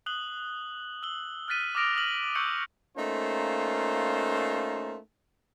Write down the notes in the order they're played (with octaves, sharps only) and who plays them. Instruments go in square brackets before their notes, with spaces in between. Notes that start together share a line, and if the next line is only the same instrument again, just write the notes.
[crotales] D#6 F#6 F#7 G7
E6 F#7 G7
F6 F#6 A6 B6 D#7
D6 D#6 F6 A#6 D7 F7
D#6 F6 F#7
C#6 E6 F#6 G6 C#7 F#7
[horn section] A3 A#3 C#4 D#4 F4 C5